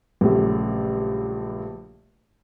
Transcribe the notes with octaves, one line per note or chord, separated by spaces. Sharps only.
A#1 G2 C#3 F#3 A3